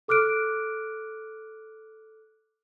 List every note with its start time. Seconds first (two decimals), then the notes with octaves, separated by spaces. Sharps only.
0.08 A4 D6 F6 F#6 D7